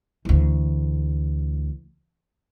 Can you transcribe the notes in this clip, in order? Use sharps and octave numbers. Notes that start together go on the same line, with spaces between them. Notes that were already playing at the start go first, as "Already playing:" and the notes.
D2 E3